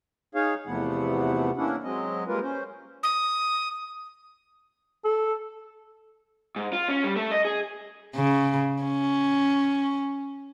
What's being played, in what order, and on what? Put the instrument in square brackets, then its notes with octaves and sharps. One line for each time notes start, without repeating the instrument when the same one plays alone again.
[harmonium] D#4 G#4 C#5 F5
E2 C3 F3 A3 B3 F#5
A#3 C#4 D4 E4 F#5
F#3 G#3 C4 D#5
G3 G#3 A#3 F4 A#4 B4
C#4 C5
[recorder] D#6
[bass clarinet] A4
[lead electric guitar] G#2
F4
C#4
G3
A3
D#5
G#4
[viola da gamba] C#3
C#4